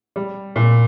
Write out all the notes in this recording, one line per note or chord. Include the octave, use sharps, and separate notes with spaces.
G3
A#2